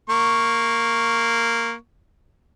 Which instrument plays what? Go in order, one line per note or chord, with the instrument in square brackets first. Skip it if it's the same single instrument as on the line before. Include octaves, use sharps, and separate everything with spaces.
[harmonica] A#3 C#6